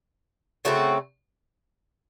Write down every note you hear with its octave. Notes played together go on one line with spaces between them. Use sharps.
C#3 A3 C4 F#4